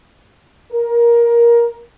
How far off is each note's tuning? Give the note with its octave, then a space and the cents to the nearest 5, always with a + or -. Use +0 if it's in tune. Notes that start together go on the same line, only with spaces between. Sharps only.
A#4 +15